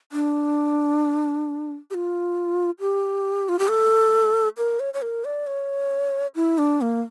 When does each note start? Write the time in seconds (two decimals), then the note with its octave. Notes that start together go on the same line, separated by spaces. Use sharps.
0.12 D4
1.91 G4
1.94 F4
2.80 G4
3.49 F4
3.59 G4
3.68 A4
4.58 A#4
4.80 C#5
4.94 C#5
5.02 A#4
5.25 D5
5.47 C#5
6.36 E4
6.58 D4
6.81 A#3